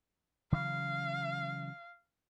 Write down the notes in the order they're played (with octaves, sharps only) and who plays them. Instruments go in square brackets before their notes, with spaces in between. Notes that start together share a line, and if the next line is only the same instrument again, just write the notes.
[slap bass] C#3 E3 F#3 [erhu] F5